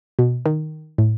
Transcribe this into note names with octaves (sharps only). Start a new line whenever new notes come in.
B2
D#3
A2